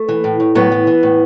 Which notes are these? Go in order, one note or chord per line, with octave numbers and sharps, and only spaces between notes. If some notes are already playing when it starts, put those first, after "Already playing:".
Already playing: A3
E3
A2
A2
A2 F#3 B3
E3
E3
A2